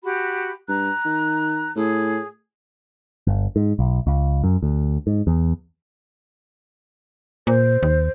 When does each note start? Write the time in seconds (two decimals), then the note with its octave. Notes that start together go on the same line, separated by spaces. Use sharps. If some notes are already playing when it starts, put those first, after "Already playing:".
0.03 F#4 G4 B5
0.69 G2 A#5 F#6
1.05 D#3
1.76 A2 G#4
3.27 G1
3.56 G#2
3.79 B1
4.07 C#2
4.44 F#2
4.63 D2
5.07 G#2
5.27 E2
7.47 A#2 C5
7.83 D#2